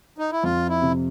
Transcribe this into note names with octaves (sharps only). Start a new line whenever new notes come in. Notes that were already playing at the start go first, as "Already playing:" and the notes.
D#4
E4
F2 F4
E4
C3